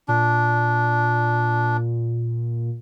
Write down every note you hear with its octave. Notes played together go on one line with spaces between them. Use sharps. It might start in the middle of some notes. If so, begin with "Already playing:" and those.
A#2 D4